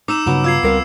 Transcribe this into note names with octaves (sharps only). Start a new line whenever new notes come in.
D#4 D6 E6 E7
G2 C#3 F#3 B3 A#4
F4 E6 G#6 C7
C#2 G3 C4 A#4 F5